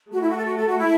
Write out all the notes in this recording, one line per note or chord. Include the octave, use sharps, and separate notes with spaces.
A3 F#4
E4
F#4
A4
F#4
A4
F#4
E4